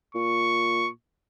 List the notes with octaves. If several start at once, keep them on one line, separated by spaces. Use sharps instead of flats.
A#2 C#6